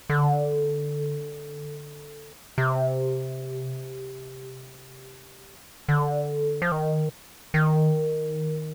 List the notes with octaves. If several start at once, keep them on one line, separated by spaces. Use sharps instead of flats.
D3
C3
D3
F3
D#3
D#3